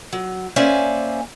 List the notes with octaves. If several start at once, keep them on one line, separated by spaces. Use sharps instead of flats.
F#3
A#3 C#4 C5 D5 E5 G#5